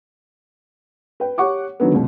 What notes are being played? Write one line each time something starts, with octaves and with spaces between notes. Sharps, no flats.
B4 G5
G4 C#5 F#5 C#6 D6
D3 D#3 F#3 B3
C#2 B2